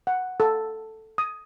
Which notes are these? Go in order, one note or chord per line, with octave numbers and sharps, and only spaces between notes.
F#5
A4
D#6